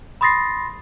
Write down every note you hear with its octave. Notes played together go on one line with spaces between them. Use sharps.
B5 C6 D#6 A6 A#6 C7